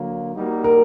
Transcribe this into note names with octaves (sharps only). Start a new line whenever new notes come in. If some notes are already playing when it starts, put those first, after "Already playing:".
Already playing: D3 F#3 A#3
G3 A#3 D#4 F#4
A#4